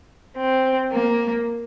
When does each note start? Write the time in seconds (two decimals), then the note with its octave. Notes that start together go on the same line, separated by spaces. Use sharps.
0.36 C4
0.90 A#3